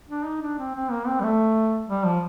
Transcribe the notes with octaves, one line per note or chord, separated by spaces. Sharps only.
D4
D#4
D4
C4
C4
A#3
C4
G3
A3
G3
F3